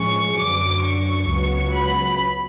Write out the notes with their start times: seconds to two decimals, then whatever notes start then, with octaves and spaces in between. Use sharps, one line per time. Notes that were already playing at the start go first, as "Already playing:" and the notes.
Already playing: A2 F3 G#3 C#4 C#6
0.39 F#2 D3 F#3 D6
0.84 C#6
1.30 C#2 C#3 F#3 B3
1.76 B5